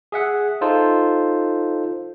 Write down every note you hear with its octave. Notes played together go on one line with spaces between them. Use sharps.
G#4 E5 F#5
D#4 F4 A4 C5